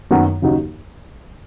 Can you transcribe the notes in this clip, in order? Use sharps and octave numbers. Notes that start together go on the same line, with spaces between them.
F#2 D#3 F#3 B3 F#4
D#2 C#3 F#3 D#4 F#4